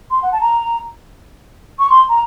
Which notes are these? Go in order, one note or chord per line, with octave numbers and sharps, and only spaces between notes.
C6
F#5
A5
A#5
C#6
C6
A#5